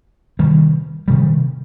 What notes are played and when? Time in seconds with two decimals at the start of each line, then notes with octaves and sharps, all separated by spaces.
0.39 C3 D#3 G3
1.08 C3 D#3 G3